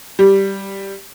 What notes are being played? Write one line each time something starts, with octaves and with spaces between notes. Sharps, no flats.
G3